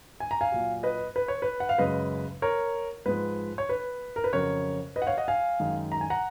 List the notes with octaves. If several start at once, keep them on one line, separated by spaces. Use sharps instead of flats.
G#5
A#5
F5 G#5
A#2 F#3
B4 D#5
B4
C#5
B4
F#5
F5
F#2 C#3 G#3 B4 D#5
A#4 C#5
G#2 F3 G#3 B4
C#5
B4
A#4
B4
F2 C#3 F#3 A#4 C#5
B4 D#5
F#5
C#5 F5
D#5 F#5
F5 G#5
F#2 D#3 G#3
A#5
G#5
F#5 A#5